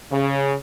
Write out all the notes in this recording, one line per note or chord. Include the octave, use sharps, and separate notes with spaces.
C#3